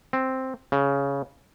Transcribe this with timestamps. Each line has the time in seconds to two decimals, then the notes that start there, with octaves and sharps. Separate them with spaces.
0.13 C4
0.72 C#3